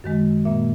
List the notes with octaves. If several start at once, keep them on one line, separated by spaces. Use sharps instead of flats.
F#2 D#3 G#3
A#2 A#3 E5